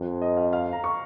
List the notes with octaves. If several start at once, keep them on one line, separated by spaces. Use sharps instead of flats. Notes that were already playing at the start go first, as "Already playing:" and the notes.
Already playing: F2
D#5
F5
F5
A#5
C#6